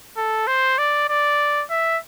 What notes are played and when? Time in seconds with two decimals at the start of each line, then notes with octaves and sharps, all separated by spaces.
0.17 A4
0.47 C5
0.78 D5
1.09 D5
1.70 E5